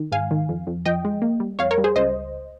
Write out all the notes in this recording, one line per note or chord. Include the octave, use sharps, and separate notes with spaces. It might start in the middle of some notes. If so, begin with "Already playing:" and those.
Already playing: D#3
G#2 F5 G#5
D#3
F2
F2
F3 D#5 G5
G#3
A#3
G3
F2 C#5 F5
A#4 C#5
G3
G#4 C5
C#2 C5 D#5